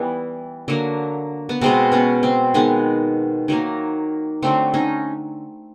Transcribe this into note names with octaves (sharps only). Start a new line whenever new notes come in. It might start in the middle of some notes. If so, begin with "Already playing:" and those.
Already playing: E3 G3 B3
D3 F#3 A#3
B3
B2 G#3 B3 C4
B3 C#4
C4
D#3 G#3 B3
D#3 F#3 A#3
D3 F#3 A3 C4
C#4 D#4